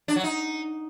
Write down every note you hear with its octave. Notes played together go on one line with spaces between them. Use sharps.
D4
F#3
D#4